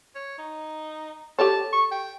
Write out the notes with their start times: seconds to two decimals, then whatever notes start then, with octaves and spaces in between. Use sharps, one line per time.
0.15 C#5
0.38 D#4
1.39 G4 A4 C#5 A5
1.73 C#6
1.91 G5